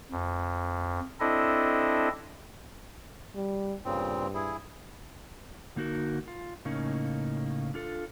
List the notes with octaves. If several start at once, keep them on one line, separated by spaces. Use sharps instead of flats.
F2
C4 D4 E4 A4 D#5
G3
G2 A#2 C#3 C4
E4 G#4
D3 A#3 D#4 F#4 A#4
F4
A2 C#3 A#3 C#4 D#4
D4 F4 A4